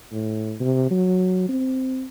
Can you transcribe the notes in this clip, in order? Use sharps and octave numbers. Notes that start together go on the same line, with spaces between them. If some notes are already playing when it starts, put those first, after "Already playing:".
A2
C3
F#3
C4